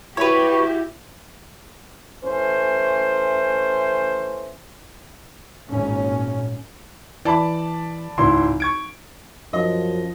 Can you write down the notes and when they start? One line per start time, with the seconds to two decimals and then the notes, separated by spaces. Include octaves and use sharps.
0.17 E4 F#4 G4 B4 C#5
2.25 E3 A3 C#4 C5
5.69 G#1 A#2 C#4
7.25 E3 D5 A5 B5
8.18 G#1 C#2 E4 C6
8.60 C#6 G#6 D7
9.53 F#2 F3 D#5